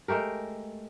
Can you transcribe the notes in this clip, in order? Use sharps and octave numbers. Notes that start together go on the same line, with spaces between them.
G#3 A3 G4 A#4